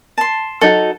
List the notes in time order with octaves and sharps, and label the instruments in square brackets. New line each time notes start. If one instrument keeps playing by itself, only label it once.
[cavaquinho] A5 C6
[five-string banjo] F#3 D#4 F#4 [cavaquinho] A4